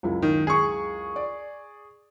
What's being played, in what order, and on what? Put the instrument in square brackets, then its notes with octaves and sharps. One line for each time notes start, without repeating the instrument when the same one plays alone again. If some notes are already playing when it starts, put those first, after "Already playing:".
[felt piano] C#2 F#2 E4
[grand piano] D#3
G#4 C#6
[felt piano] D5